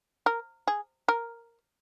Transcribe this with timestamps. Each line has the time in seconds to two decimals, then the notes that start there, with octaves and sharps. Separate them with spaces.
0.26 A#4
0.67 G#4
1.08 A#4